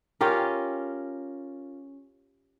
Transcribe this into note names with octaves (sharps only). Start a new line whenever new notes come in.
C#4 F4 G4 A#4